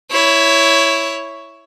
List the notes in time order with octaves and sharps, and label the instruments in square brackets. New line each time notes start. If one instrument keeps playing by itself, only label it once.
[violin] E4 C#5